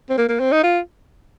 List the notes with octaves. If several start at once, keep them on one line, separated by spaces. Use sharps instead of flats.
C4
A#3
A#3
C4
D#4
F4